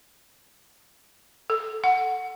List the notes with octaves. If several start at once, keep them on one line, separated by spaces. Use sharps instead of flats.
A4
F#5